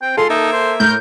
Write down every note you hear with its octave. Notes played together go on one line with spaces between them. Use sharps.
C4 G5
G#3 F4 A4 C6
A#3 D#4 E5
C5
A2 A#4 G6